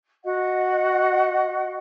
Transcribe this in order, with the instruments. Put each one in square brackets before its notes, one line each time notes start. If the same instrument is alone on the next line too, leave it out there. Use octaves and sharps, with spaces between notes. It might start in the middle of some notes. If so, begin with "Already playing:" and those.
[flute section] F#4 D#5 F#5